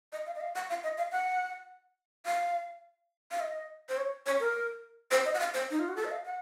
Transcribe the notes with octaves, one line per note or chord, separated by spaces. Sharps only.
D#5
F5
D#5
F5
F#5
F5
D#5
F5
F#5
F5
F5
D#5
C5
C#5
C#5
A#4
C5
D#5
F#5
F5
C5
D#4
F4
F#4
A4
D#5
F5
F#5